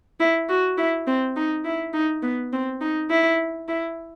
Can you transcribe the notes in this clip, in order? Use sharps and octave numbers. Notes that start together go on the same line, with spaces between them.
E4
F#4
E4
C4
D#4
E4
D#4
B3
C4
D#4
E4
E4